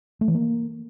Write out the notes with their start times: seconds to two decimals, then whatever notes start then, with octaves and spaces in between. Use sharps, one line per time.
0.21 A3
0.28 E3
0.35 A#3